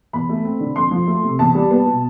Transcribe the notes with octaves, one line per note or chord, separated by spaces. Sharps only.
E2 B5
A3
C4
D3
F2 C6
F3
A3
C3
E2 A5
G3
B3
B2